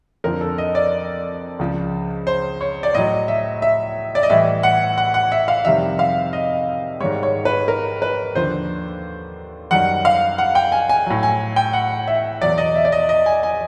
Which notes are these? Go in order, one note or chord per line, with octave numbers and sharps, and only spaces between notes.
F2 D3 F3 A#4
A4
D#5
D5
C#2 C#3 F3
C5
C#5
D5
A2 F#3 D#5
E5
E5
D5
D#5
A2 E3 G3 E5
F#5
F#5
F#5
E5
F5
F2 C3 D#3 G3 E5
F5
D#5
G#2 D#3 G3 C#5
C#5
B4
A#4
B4
D#2 D3 F3 C5
F#2 D#3 G3 F#5
F5
F#5
G5
G#5
G#5
A2 F#3
G#5
G5
F#5
E5
E2 B2 F#3 D5
D#5
E5
D5
D#5
D#5
G#5
G#5